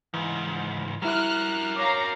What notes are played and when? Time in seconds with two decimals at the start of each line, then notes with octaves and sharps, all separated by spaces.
0.14 C#2 G#2 E3
1.02 G3 E4 F#4 A#4 F6 F#6
1.76 C#5 F5 A#5 D6